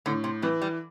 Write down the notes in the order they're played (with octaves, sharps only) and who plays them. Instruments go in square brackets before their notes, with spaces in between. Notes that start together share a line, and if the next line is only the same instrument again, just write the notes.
[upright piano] A2 [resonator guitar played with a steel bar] D3
[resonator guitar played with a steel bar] C3
[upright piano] E3 [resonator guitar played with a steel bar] G3
[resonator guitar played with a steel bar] G3